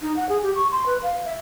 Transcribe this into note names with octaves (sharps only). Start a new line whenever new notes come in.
D#4
F#5
G#4
G4
C#6
C6
B4
F5
E5